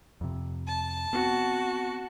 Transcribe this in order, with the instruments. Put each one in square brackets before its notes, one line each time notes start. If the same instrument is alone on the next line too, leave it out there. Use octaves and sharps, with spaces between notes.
[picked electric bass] F2 C3
[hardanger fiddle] A5
[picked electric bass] B3 C4 [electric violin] F#4